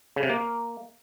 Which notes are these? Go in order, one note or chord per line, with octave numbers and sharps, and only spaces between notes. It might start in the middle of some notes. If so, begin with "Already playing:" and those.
C#3
C3
A#3